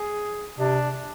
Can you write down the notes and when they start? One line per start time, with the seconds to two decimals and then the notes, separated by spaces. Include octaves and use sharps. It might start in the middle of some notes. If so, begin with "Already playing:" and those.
Already playing: G#4
0.59 C3 D4